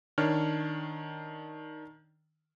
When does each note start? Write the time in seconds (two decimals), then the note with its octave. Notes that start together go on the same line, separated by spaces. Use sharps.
0.18 D#3 D4 C#5 F6